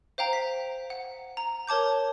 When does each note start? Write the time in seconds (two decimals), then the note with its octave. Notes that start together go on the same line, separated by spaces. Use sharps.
0.18 C5 F5 G5 A#5
0.33 B6
0.90 F#5
1.37 A#5
1.67 A#4 C#5 A5 D6 G6